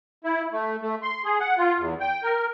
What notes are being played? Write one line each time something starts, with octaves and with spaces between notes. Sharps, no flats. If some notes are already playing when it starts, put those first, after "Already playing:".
E4
A3
A3
C6
G#4
F#5
F4
E2
G5
A#4